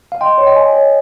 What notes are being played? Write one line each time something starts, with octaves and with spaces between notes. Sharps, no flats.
F5
D#5 G5 C6
C#5
D#5 G5
G#5
C#5